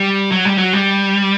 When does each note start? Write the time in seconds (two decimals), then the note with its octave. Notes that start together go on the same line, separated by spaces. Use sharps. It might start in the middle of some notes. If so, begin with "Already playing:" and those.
Already playing: G3
0.32 F#3
0.45 G3
0.58 F#3
0.73 G3